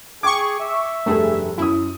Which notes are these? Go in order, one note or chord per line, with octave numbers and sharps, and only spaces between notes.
G#4 G5 C#6 D6 G#6
E5
F1 G2 A3 G#4 A4
F#2 E4 D#6